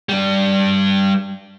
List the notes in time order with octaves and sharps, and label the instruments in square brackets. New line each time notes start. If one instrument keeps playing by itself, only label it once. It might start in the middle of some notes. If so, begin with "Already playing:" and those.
[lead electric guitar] G3 D4